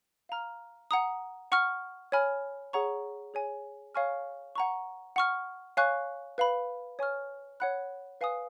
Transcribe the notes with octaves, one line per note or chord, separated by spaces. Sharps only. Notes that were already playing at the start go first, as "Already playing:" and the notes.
F5 A#5 F6
F#5 A#5 D#6
F#5 C#6 F6
C#5 G#5 B5 F6
G#4 C#5 F#5 A#5 C#6
G#4 C#5 G#5
C#5 F5 G#5 C#6 F6
F#5 A#5 C#6
F#5 C#6 F6
C#5 F5 G#5 C#6 F#6
B4 F5 B5
C#5 G#5 C#6 F6
C#5 F#5 B5 F#6
B4 F5 G#5 D#6